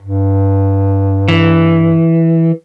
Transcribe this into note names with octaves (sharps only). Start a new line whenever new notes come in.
G2
E3